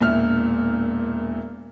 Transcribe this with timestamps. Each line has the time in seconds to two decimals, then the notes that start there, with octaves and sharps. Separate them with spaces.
0.01 E1 A#2 E5 F6